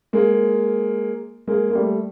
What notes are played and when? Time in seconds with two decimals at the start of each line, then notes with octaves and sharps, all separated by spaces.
0.13 G#3 A#3
1.47 G#3 A#3
1.71 A#3
1.75 G3 A3